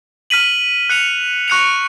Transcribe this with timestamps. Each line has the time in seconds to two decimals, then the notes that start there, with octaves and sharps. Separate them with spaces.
0.30 F6 B6 D#7 F#7
0.90 F#6 C#7 F7
1.48 C#6 F#6 C#7 F7